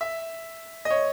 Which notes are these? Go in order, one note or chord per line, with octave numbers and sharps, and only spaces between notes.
E5
D#5
C#5